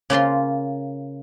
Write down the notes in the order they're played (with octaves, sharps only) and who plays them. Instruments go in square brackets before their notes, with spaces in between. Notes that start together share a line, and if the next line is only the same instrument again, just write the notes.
[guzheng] C#3 A#3 F4 C6